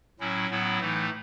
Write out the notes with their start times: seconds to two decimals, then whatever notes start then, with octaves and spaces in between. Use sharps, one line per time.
0.20 A2 F#3 C#4 E4
0.50 A2 F#3 B3 E4
0.80 A2 E3 A3 D#4